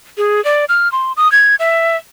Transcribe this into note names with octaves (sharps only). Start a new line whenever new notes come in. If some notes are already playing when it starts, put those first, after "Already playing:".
G#4
D5
F6
C6
D#6
G#6
E5